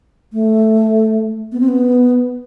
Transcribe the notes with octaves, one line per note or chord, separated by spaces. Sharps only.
A3
B3
C4
B3